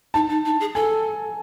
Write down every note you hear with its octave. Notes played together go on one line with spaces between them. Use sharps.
D#4 A5
D#4
D#4
G#4
A4 G#5